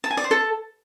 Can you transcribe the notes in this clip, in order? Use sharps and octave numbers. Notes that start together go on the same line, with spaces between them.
A5
G#5
D5
C5
A4